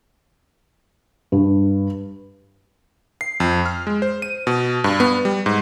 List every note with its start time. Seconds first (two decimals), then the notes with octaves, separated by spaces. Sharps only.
1.32 G2
3.21 C7
3.40 F2
3.66 F6
3.87 G#3
4.02 C5
4.22 D#7
4.47 B2
4.84 G2
5.00 B3
5.25 G3
5.46 G#2